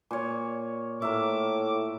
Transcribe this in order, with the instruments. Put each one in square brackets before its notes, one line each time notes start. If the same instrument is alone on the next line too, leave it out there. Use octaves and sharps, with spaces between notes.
[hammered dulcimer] A#2 C#5
[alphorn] A2 [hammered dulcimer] A#4 E5 [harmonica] D6